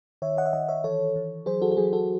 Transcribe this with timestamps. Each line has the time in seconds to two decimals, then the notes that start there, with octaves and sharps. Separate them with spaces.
0.22 D#3 C#5 E5
0.37 D#5 F#5
0.46 E5
0.53 D#3 D#5 F#5
0.68 C#5 E5
0.84 E3 A4 C#5
1.16 E3
1.46 F#3 G#4 C5
1.62 F#4 A4
1.72 F#4
1.77 F#3 G#4
1.93 F#4 A4